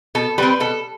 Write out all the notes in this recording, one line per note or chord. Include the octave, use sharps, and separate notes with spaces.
B2 A4
G3 C4 B4
B2 A4